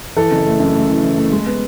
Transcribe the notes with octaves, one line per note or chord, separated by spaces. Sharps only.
E3 A4
F#1
A3
F#2
A3
E3
E3
A3
G#3
B3